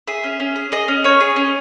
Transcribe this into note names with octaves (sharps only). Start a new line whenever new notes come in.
G#4 E5
C#4
C#4
G#4
G#4 D#5
C#4
C#4 C#5
G#4
C#4